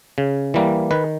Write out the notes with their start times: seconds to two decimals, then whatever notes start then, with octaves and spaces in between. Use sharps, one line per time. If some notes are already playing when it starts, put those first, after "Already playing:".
0.18 C#3
0.54 E3 G3 A#3
0.91 D#3 B4